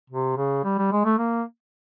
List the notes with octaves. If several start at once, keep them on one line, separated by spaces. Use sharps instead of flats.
C3
C#3
G3
G3
G#3
A3
A#3